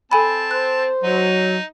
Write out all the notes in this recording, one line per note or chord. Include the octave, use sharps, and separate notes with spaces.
C4 A4 G#5 A5 B5
C5 F#6
F#3 D#4